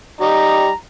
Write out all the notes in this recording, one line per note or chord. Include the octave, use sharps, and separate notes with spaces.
G3 D#4 A#5